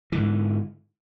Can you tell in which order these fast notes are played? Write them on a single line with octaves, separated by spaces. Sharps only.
E3 D3 G#2